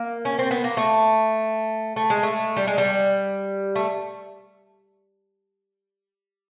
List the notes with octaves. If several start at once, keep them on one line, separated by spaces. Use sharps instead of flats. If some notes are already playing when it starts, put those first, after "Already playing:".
Already playing: A#3
C#4
C4
B3
A#3
A3
A3
G#3
A3
G3
G#3
G3
A3